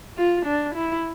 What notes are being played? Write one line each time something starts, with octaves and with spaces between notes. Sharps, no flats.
F4
D4
E4